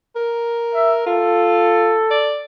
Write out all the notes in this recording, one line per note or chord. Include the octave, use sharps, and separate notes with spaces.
A#4
E5
F4 A4
D5